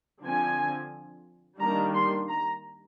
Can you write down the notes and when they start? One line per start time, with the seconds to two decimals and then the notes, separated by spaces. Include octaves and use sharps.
0.22 D3 F3 C4 G#5
1.60 D#3 G3 A#3 D4 A#5
1.95 C6
2.29 A#5